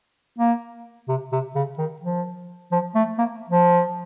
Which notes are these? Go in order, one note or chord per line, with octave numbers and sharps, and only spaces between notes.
A#3
C3
C3
C#3
D#3
F3
F3
A3
A#3
F3